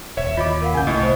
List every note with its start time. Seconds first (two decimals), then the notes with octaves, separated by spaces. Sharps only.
0.17 D#1 C#5 E5
0.37 D#2 F4 C#5 D#5 B5 D6
0.62 A#4 F5 F#5
0.75 A1 C#3 G#5 G6
0.87 C2 A2 A3 E4 D#5
0.99 C5 D#5